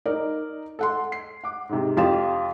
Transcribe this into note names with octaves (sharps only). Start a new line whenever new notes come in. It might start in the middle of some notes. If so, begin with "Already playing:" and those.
D#4 A#4 D5
A4 F#5 C6
C7
F#5 D6
G#2 C3
F2 F4 G4 A6 E7